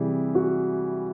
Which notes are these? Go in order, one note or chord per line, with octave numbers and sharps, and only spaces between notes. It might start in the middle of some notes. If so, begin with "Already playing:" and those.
Already playing: C3 E3 G3 G#4
F#4